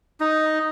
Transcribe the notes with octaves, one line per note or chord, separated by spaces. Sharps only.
D#4